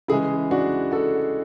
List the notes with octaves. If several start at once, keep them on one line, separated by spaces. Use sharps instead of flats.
C#3 E3 G#3 E4 G#4
D4 F#4
F#4 A4